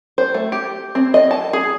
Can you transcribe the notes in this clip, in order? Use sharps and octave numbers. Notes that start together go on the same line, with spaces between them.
C5
A3
G4
C4
D#5
A5
G#4